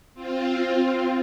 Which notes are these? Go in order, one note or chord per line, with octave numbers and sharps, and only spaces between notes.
C4 F4